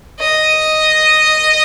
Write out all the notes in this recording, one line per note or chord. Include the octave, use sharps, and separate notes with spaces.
D#5